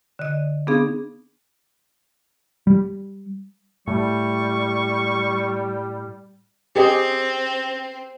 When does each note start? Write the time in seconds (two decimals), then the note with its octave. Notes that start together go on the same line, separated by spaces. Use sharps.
0.19 D3 D#5
0.67 B3 C4 D4 D#4 G#4 F5
2.67 G3
3.88 A2 G3 C#6
6.76 C4 G4 G#4 D#5